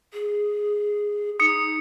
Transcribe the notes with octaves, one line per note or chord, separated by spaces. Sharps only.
G#4
D#4 D#6 C#7